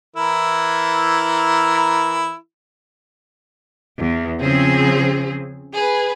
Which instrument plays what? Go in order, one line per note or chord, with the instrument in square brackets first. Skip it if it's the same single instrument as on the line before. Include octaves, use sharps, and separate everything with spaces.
[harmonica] E3 E4 A#4
[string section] E2
C#3 F3 C4 G#4
G#4 B4